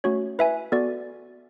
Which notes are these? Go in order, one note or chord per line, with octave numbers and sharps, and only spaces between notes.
A3 C#4 F#4 C#5
E4 B4 E5 G#5
B3 F#4 A4 D5